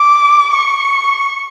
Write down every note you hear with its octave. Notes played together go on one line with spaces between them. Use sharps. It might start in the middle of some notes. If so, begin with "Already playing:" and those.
Already playing: D6
C#6